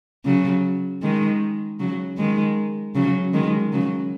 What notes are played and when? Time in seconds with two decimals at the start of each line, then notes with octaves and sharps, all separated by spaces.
0.25 C#3 F#3
1.02 D#3 G#3
1.79 C#3 F#3
2.18 D#3 G#3
2.95 C#3 F#3
3.34 D#3 G#3
3.73 C#3 F#3